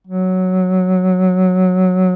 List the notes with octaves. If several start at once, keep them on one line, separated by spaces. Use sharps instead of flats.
F#3